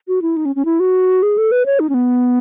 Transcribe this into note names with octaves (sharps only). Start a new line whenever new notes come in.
F#4
E4
D#4
C#4
C#4
E4
F#4
G#4
A4
B4
C#5
D#4
C#4
B3